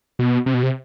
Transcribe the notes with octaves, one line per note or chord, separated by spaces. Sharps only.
B2
C3
B2
C3